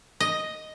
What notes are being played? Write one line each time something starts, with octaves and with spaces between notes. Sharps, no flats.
D#5